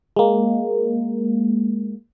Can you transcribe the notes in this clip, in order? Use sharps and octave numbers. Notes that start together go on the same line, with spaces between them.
G#3 A#3